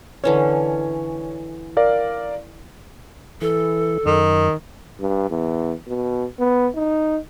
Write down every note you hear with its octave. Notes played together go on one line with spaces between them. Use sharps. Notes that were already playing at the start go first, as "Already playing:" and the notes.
D3 E3 C#4 C#5
A#4 D5 F5
E3 A4
F#2 D#3
G2
E2
B2
B3
D#4